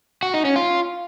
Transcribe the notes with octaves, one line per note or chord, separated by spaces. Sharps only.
F#4
D#4
C#4
F4